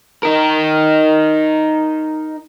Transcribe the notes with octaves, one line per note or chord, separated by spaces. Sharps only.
D#4 A#4